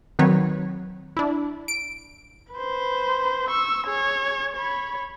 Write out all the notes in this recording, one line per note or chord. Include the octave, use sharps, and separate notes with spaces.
D#3 F#3 C4 B4 C#5
D4 E4
D7
B4 C5
C#6 E6
G#4 C#5
C#5 B5